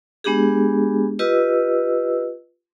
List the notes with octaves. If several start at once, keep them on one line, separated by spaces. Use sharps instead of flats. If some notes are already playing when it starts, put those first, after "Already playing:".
G#3 B3 D4 G4 G#4
F4 G4 B4 D#5 E6